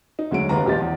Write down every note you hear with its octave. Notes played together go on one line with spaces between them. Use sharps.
D#4
D2 F#3 G#3 D7
F#1 D#2 B4 A#5
A#1 F3 G4 D#5 A6
E2